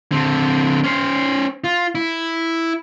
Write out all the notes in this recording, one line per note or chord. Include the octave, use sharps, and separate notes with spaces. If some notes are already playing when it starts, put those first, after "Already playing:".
D3 C4
C#4 C5
F4
E4